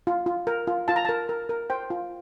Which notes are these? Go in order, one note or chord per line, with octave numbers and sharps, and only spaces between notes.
F4
F4
A#4
F4
F4 A5
A#5
A#4 A5
A#4
A#4
C5 G5
F4